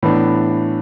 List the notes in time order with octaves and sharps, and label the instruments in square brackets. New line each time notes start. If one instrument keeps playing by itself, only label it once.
[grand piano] A2 E3 B3 D4